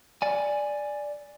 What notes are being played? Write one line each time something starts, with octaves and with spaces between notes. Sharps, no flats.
D5 G#5